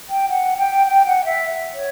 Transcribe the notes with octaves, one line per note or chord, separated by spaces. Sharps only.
G5
F#5
G5
G5
F#5
E5
C#5